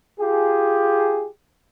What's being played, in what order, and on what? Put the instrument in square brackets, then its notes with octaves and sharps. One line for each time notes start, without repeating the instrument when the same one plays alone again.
[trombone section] F4 G4 G#4